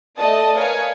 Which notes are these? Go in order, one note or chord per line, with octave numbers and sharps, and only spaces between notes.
A3 D5 D#5 A5 D#6
A#4 B4 C#5 F5 G#5